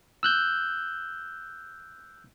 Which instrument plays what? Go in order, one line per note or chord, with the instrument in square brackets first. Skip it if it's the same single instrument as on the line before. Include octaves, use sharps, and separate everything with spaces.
[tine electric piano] E6 F#6 G6